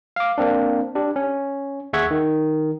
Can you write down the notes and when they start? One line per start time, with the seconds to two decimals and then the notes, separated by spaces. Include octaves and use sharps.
0.16 F5 D6
0.38 A#3 C4 D4
0.95 D4 G4
1.16 C#4
1.93 D#2 G#4 E5 F#5 C#6 G#6
2.11 D#3